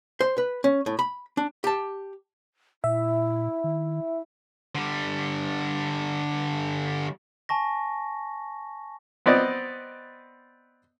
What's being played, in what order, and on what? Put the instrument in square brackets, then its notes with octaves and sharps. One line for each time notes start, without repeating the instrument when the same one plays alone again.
[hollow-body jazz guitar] C5
B4
C#4
A2
B5
D4
G4 A5
[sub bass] A#2 [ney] E4 [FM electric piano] E5
[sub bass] D#3
[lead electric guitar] D3 G3
[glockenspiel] G#5 A5 C#6 A#6
[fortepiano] B3 C4 D5 D#5